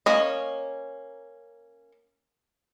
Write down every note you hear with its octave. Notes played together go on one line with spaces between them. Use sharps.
A#3 C#4 D#5